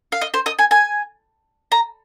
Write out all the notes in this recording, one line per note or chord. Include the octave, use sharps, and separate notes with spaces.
F5
D#5
C5
D#5
G#5
G#5
A#5